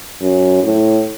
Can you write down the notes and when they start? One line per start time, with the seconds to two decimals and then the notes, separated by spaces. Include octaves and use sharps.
0.21 F#2
0.63 A2